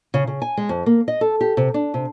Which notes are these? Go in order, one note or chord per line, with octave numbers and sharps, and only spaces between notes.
C#3
C#3
G#5
G#3
F2
A#3
D#5
A4
G4
C3
D4
C3